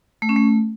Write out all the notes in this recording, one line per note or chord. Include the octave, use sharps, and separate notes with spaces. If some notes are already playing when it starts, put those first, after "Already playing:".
A3
C#4
A3